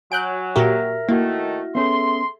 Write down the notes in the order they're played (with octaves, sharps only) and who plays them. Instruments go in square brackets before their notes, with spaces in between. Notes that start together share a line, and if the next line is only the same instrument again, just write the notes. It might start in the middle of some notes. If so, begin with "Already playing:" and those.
[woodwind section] F#3 [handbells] G#5 [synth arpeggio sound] F#6 G6 D7
[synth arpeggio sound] A#2 F#4 G4 [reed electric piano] A#4 [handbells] E5 F6 A#6
[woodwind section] D#3 A3 [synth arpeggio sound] A#3 [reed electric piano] E4 F#4
[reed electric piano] B3 C#4 [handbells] G#4 A4 E5 [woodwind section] C6